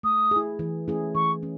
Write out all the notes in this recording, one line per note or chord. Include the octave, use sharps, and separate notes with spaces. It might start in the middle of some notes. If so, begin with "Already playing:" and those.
A3 D#6
E4 G#4
E3
A3 C#4 E4 G#4
E3 C#6
C#4